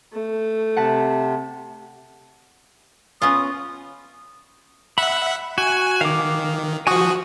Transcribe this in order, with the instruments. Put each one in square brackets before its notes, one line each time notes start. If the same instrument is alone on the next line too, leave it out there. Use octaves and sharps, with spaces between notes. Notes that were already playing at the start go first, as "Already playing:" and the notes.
[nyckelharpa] A3
[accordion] C3 [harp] F#5 A5 B6
[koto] B3 C#4 F4 [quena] D#6
[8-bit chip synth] E5 F#5 [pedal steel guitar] B5
[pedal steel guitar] F#4 [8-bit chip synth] G#5
[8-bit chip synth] D#3 [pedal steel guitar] F5 D6
[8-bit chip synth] F3 F#4 [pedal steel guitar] G#5 C#6 D#6